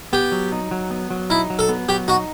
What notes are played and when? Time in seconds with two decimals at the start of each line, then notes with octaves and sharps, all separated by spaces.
0.13 B3 G4
0.32 F#3
0.52 D#4
0.71 F#3
0.91 B3
1.10 F#3
1.30 D#4 E4
1.50 F#3
1.59 A4
1.69 B3
1.88 F#3 G4
2.08 D#4 F#4